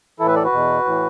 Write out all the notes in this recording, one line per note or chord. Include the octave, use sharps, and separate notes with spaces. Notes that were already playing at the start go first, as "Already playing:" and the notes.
A2 E3 E4 A4 B4 E5
A4 D5
F#4 B4
E2 B2
A2 E3